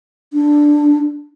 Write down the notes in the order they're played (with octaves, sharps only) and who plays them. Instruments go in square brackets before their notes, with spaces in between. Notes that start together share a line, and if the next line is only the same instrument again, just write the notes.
[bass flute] D4